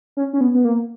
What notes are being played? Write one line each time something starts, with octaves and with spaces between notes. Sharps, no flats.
C#4
C#4
B3
B3
A#3